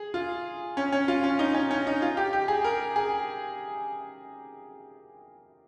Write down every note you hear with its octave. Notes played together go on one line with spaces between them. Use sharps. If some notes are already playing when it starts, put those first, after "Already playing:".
Already playing: G#4
F4
C#4
C#4
F4
C#4
D#4
C#4
C#4
D#4
F4
G4
G4
G#4
A#4
G#4